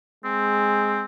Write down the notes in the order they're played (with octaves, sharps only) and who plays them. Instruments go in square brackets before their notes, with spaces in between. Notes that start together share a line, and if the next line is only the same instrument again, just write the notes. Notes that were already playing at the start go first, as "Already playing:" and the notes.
[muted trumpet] G#3 [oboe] C4